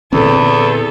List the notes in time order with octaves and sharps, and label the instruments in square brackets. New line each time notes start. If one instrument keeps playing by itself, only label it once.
[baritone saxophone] E2 [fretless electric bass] A#2 D3 C4 [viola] A4